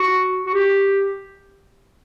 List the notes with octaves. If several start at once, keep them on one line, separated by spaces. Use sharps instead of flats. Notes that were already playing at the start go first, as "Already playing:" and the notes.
Already playing: F#4
F#4
G4